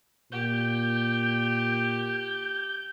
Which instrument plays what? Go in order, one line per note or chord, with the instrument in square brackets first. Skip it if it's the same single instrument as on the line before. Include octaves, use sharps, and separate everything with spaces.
[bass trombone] A#2 [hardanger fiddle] G4 [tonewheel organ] G6